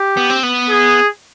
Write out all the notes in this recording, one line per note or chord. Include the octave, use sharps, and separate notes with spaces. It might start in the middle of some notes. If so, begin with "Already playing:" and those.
Already playing: G4
B3
C4
B3
G#4